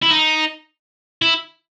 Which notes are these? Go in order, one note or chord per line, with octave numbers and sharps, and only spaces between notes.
E4
D#4
E4